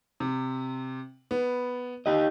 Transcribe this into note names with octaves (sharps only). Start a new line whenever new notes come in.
C3
B3
D#4 G4 D#5